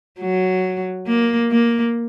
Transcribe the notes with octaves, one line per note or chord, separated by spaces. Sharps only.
F#3
A#3
A#3